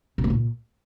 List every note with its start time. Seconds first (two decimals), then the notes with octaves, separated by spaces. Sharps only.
0.18 B2
0.24 A3
0.30 A#2